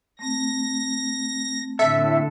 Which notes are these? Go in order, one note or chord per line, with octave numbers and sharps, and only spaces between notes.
A3 C4 A#6
A2 D3 A4 E5